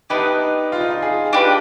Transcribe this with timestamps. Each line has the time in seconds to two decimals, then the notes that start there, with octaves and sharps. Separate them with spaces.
0.10 B3 D4 D#4 G4 B4
0.72 F4
0.81 D#4
0.90 F4
1.02 G#4
1.33 D4 G4 B4